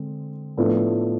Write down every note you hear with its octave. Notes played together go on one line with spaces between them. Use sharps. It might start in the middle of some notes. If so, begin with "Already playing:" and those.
Already playing: D3 G#3 C4
A2 F3 B3 D4 A4